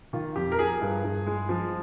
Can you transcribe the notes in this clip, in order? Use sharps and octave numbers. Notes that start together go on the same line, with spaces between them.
D#3 F4
F2 G4
A#4
F3 G#4
G2
G2
G#3
F3